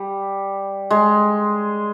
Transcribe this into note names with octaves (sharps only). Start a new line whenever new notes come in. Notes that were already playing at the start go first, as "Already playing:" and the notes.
Already playing: G3
G#3